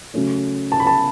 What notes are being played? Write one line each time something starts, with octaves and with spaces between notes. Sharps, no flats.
C#3 F#3 A3 C#4
A5
B5
A5